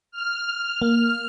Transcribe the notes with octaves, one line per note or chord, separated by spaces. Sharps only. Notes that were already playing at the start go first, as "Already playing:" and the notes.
F6
A#3